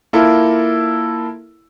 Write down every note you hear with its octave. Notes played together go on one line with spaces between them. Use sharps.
A#3 E4 F4 A4 A#4